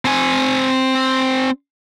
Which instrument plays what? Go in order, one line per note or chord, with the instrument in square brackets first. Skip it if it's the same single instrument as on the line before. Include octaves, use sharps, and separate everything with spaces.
[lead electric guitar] C4 G#5